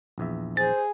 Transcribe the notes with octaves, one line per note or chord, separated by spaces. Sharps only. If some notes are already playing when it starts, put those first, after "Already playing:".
A#1 E2 E5
G#4 C5 A6